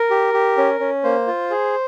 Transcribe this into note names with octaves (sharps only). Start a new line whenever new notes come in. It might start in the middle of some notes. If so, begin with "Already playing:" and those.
Already playing: A#4
G4
G4
C#4
C#4
A#3 C5
F4
G#4